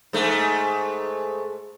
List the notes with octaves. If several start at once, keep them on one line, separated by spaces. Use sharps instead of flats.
G#2 A3